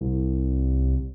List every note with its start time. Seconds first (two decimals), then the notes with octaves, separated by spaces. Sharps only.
0.01 C2